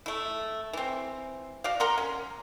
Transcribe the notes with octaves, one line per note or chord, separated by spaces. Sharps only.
A3 E4
E3 C4
F#4 D5 F5
A#4 F#5 A#5 C6
C#4